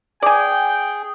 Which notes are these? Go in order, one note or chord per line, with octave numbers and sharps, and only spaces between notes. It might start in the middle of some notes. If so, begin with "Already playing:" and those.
G#4 D5 G5 G#5